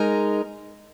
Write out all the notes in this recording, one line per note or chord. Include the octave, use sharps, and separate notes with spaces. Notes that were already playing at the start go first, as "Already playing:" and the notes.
Already playing: G#3 D#4 A#4